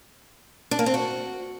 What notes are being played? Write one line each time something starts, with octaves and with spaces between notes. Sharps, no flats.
D4
A#3
C4
F#4